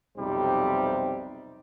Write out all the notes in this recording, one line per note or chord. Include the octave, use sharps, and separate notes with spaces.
B1 F2 C3 G3 D#4 C5